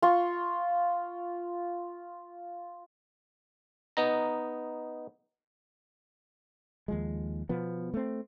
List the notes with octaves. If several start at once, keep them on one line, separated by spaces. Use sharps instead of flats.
F4 C6 C#6
B3 D#4 A#5
D#2 F3 G#3
B2 F3 B3
A3 C4